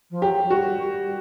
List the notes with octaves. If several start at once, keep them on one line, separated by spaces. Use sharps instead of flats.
F3
F#3 G4
F#3
G3 F#4
G3